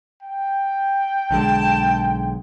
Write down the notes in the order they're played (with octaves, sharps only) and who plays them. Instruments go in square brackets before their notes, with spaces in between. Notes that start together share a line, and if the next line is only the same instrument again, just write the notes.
[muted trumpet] G5
[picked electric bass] B1 D3 G#3 [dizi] A5